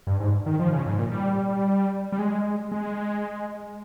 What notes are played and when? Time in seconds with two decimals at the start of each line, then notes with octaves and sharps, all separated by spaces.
0.07 G2
0.20 G#2
0.46 D#3
0.59 F3
0.73 C#3
0.86 G#2
0.99 A#2
1.12 G3
2.12 G3
2.19 G#3
2.72 G#3